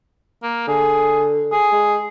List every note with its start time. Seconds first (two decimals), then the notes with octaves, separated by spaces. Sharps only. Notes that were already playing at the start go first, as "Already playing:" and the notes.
0.43 A#3
0.68 D3 G#4
1.52 G#4
1.73 G#3